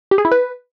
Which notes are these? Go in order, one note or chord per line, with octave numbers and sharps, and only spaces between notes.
G4
G#4
E4
B4